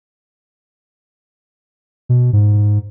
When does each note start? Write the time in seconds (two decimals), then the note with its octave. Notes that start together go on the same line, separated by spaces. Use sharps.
2.09 B2
2.33 G#2